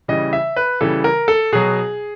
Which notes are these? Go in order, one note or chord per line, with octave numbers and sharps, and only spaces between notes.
C#3 E3 G3 D#5
E5
B4
C#3 E3 G3 A4
A#4
A4
B2 F#3 G#4